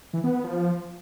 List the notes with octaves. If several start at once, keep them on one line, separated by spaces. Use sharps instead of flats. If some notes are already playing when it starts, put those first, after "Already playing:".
E3
B3
B3
F3